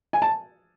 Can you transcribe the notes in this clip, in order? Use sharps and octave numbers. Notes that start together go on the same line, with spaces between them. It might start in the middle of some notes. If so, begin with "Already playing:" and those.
G#5
A5